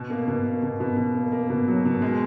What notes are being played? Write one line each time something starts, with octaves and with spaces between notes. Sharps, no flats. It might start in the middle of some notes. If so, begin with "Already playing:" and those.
Already playing: B2
A#3
B2
A#3
B2
B2
B2
A#3
A#3
B2
F#3
B2
G#3